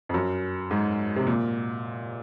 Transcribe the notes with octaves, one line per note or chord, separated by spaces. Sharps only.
F2
F#2
G#2
C3
A#2